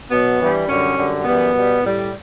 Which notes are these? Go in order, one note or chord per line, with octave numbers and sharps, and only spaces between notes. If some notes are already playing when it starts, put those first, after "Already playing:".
B2 F#3 B3
G2 E3 G3
F#2 D3 G3 C#4
F#2 D3 G3
F#2 E3 G3 B3
B2 G3
A2 G3